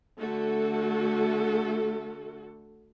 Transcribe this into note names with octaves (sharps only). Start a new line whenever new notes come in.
D3 A3 F#4 A4